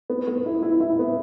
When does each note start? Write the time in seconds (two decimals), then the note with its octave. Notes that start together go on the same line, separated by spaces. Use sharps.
0.10 B3
0.28 B3
0.46 E4
0.63 E4
0.80 E4
0.99 B3